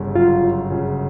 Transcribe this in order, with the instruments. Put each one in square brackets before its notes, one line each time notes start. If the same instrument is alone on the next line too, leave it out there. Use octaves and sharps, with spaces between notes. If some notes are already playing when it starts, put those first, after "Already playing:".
Already playing: [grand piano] G1 C#3
[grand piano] F#2 [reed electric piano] F4
[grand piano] F#3
C#3